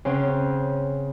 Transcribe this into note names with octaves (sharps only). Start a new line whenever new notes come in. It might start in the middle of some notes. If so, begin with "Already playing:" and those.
C#3 C4 C#4 F#5